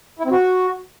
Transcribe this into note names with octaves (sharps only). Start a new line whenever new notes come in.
E4
C4
F#4